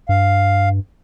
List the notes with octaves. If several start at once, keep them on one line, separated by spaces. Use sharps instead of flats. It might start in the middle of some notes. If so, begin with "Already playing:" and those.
G2 F5